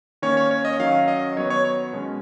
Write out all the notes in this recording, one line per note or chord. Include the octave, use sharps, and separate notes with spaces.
D#3 A#3 C#4 C#5
C#5
C#5
D#5
D#3 F#3 C#4 F5
D#5
D#3 F#3 B3 C#5
C#5
C#5
B2 G#3 C#4